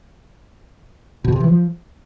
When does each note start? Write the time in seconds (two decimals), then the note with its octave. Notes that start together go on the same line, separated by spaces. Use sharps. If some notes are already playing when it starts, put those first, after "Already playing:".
1.24 B2
1.32 C3
1.40 E3
1.48 F3